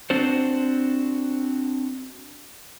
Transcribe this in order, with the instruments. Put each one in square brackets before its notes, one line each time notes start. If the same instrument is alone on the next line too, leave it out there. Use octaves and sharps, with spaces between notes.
[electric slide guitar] C4 D4 F#4 C5